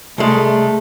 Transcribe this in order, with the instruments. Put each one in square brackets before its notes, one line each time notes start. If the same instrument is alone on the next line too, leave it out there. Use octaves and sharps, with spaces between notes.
[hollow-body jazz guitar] C2 G#3 [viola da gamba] A3